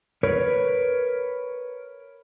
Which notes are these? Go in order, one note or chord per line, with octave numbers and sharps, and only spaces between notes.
A#4 B4 C#5